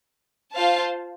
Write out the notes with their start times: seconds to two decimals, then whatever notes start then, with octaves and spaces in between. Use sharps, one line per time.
0.55 F4 C5 F5 A5